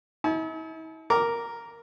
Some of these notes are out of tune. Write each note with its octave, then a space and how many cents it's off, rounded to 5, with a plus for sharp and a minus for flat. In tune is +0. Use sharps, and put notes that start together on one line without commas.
E4 -45 A5 -45
A#4 +0 A#5 +0 D6 -5